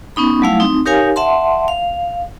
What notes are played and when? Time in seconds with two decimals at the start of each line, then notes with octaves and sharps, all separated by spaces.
0.16 B3 C#4 D#4 B5
0.42 F#3 G3 A3 E4 F5
0.60 C4 D#4
0.86 D#4 G4 A#4 C#5 F5 G#5
1.16 E5 F#5 A5 C6
1.68 F5